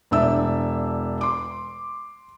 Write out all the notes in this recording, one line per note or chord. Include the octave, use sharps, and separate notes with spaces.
E1 D4 E5 E6
C6 D6